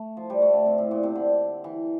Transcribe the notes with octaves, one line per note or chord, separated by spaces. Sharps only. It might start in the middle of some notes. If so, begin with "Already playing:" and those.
Already playing: A3
F3
G3
A3
D3
C3
A2
A#2
C3
D3
E3